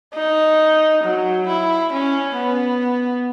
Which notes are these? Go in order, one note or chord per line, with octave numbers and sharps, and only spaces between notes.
D#4
F#3
E4
C#4
B3